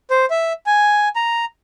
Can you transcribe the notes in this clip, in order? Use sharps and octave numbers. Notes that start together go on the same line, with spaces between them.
C5
E5
G#5
A#5